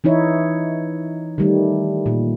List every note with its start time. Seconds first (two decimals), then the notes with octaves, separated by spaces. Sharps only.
0.04 E3 D#4 E4 C#5
1.38 D#3 G3 A3
2.06 A#2